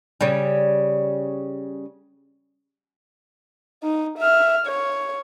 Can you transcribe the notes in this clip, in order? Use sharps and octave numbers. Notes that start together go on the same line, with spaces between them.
C#3 G3
D#4
E5 F6
C#5